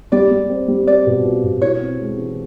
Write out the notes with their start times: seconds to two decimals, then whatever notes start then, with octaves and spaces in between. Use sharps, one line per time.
0.12 G3 D5
0.31 G3
0.49 C4
0.68 G3
0.87 C4 D5
1.07 B2
1.24 F4
1.44 B2
1.62 E4 C#5
1.81 C4
2.00 G#3
2.18 E3